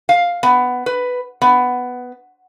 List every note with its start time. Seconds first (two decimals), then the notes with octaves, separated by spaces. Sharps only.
0.09 F5
0.43 B3
0.86 B4
1.42 B3